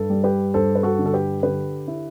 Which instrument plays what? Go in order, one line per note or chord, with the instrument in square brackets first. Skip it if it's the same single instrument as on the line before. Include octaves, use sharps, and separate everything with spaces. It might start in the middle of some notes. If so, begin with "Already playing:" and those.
Already playing: [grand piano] G2 A4
G3
G4 B4
G2 A4 C5
B4
F#4 A4
D3
A4
G4 B4
D3 G4 B4
E4